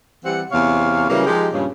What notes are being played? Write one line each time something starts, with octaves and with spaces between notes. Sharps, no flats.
E3 G3 C4 F#5
E2 C3 C#5 F5
C#3 E3 F#3 G3 A#3
F3 G#3 D#4 G4
G2 A#2 C#3